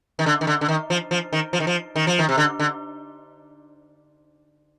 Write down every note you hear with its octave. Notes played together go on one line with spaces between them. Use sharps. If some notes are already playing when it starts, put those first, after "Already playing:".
D#3
D3
D#3
D3
D3
D#3
F3
F3
D#3
F3
D#3
F3
D#3
F3
D#3
C3
D3
D3